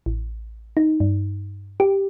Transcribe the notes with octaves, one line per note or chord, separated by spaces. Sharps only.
A1
D#4
G2
G4